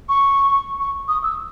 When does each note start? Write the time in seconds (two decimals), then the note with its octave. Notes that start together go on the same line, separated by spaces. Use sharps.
0.09 C#6
0.80 C#6
1.08 D#6
1.23 E6